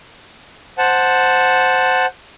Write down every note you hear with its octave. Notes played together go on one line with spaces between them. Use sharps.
C5 F#5 A5